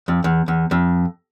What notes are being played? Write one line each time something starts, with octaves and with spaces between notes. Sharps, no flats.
F2
E2
E2
F2